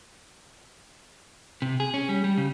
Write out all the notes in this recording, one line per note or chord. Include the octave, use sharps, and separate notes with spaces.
C3
G#4
C#4
G3
G3
C#3